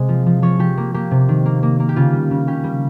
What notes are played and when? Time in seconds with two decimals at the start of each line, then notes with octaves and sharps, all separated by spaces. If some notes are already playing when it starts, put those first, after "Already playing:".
Already playing: C3 G#3 D#5
0.09 F3
0.26 F3
0.42 F3 C#5
0.59 F3 G4
0.77 A#3
0.94 A#3 G4
1.11 C3
1.29 D#3
1.46 A#3
1.63 A#3
1.80 A#3
1.89 G4
1.96 C#3 F4
2.13 G3
2.31 C#3
2.47 C#4 G4
2.64 G3